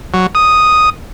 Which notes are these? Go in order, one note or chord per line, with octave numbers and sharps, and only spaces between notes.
F#3
D#6